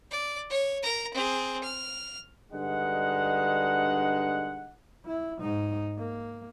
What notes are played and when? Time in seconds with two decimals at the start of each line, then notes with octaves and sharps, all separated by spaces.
0.11 D5
0.50 C#5
0.83 A#4 A#5
1.14 C4 G#4
1.63 F6
2.52 G2 D3 G#3 D#4 F#5
5.06 E4
5.41 G#2 D#4
5.98 A#3